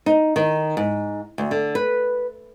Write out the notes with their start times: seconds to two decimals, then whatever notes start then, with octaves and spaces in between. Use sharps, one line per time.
0.06 D#4
0.36 D#3
0.77 G#2
1.38 D2
1.51 D3
1.75 B4